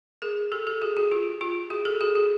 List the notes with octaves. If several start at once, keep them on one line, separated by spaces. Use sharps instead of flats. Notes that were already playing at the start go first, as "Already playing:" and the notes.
G#4 A#4
G4 A4
G4 A4
F#4 G#4
F#4 G#4
F4 G4
F4 G4
F#4 G#4
G4 A4
F#4 G#4
F#4 G#4